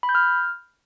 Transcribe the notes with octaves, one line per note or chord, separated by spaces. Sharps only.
B5
G6
F6